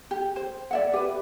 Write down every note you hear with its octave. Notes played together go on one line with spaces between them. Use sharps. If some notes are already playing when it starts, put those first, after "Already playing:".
G4
C5
D5 E5 F#5
G4 B4